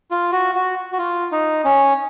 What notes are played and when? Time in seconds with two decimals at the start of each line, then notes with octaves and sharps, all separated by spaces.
0.11 F4
0.32 F#4
0.55 F#4
0.92 F#4
0.98 F4
1.32 D#4
1.65 C#4